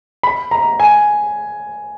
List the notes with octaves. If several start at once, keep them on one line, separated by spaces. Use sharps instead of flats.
B5
A#5
G#5